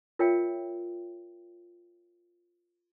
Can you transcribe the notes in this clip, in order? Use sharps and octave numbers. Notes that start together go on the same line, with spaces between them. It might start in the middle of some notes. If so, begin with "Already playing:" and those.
F4 A#4 C#5 E5 F5 G5